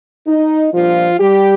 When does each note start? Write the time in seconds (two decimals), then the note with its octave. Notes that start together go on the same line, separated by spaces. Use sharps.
0.28 D#4
0.74 A#2 F3 G3 D4 F4
1.20 G3 G4